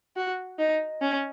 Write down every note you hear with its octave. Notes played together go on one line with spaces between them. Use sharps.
F#4
D#4
C#4